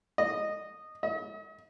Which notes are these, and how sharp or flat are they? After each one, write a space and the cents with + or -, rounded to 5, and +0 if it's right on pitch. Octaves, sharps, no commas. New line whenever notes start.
D#5 -10
D#5 +45